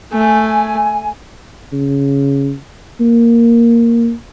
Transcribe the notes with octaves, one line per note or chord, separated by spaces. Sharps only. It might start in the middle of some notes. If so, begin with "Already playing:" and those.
A3 G#5
C#3
A#3